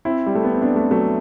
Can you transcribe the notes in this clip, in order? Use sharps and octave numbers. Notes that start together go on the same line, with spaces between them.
C4 E4
G3
A3
B3
C4
B3 D4
A3 C4
F#3 A3